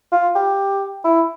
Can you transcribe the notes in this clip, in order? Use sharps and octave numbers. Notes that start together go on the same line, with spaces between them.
F4
G4
E4